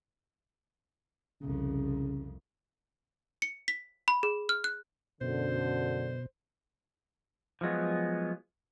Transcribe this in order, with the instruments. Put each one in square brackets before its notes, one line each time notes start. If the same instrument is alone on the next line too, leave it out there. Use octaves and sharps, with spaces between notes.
[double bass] C2 F2 [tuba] C#3
[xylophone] C#7
B6
B5
G#4
F6
F#6
[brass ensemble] F#2 D3 [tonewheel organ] B2 [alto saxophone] C5
[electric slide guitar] F3 F#3 G#3 B3